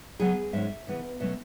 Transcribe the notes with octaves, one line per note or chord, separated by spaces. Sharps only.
C#3 F#3 B3 G#4
G#2 F#3 C#4 E5
C#3 E3 B3
B2 F#3 A3 C#4 E5